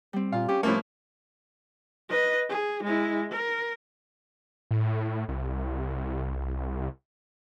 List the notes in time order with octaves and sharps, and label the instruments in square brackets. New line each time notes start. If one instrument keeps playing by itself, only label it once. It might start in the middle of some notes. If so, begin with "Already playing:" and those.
[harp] G3 C4
[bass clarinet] A#2 [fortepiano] F4
[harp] C#4 [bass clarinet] G4
[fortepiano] A2 F3 A#3 [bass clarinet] A3
[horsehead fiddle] B4 D#5
G#4
G#3 E4
A#4
[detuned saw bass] A2
C2